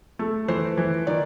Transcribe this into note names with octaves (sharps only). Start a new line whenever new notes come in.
A3
E3 C5
E3
D#3 D5